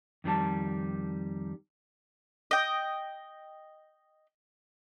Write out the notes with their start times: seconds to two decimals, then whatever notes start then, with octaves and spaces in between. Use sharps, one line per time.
0.24 F2 D#3 G3 A5
2.51 D#5 G5